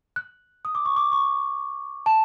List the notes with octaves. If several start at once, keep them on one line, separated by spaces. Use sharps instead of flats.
F#6
D#6
D6
C#6
D6
C#6
A5